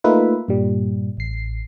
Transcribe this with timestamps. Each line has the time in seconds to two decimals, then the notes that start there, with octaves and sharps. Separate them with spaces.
0.04 A3 A#3 D#4 F4 B4 E5
0.48 G2 A#2 G3
1.17 A1 C7